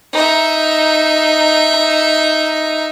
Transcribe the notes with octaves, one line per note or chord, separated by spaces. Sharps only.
D#4 E5